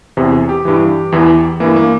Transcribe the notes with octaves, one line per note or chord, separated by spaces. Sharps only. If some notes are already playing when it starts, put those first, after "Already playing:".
E2 C3 E3
G#4
G4
G2 E3
E2 E3
G2 E3 A#3
A#3